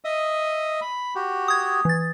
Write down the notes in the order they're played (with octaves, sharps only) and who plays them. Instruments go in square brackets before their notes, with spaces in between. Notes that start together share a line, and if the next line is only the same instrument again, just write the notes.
[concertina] D#5 E5 D#6
B5
F#4 G4
[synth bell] D#6 G#6
E3 A6